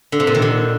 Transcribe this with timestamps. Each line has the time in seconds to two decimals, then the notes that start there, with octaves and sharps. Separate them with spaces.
0.12 D3
0.20 C3
0.27 A#2
0.35 D#3
0.42 D3